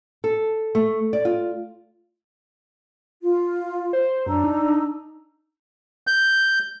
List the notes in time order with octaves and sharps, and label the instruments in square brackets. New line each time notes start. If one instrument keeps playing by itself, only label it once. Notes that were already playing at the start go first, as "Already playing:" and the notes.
[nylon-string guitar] A4
A3
D5
F4
[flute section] F4
[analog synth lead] C5
[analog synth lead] F#2 [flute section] D4 A#5 E6
[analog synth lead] D#4
[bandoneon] G6